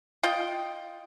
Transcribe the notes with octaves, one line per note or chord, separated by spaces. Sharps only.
F4 D#5 G5